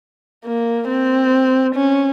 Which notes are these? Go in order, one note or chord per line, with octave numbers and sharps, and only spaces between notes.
A#3
C4
C#4